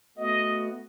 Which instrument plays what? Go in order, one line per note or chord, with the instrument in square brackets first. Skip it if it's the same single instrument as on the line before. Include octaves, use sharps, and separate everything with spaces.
[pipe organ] A3 B3 F#4 [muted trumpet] D#5